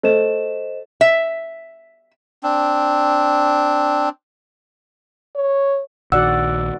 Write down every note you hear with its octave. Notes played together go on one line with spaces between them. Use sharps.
A3 C5 D#5 E7
E5
C4 D4
C#5
A#1 D#3 F#4 D5 F#5 E6